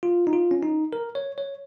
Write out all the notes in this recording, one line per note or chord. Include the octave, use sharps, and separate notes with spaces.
F4
D#4
F4
C#4
D#4
A#4
C#5
C#5